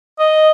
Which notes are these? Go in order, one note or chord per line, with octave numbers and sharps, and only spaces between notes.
D#5